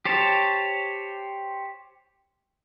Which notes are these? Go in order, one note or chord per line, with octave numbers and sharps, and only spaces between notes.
G4 C5 C#5 A5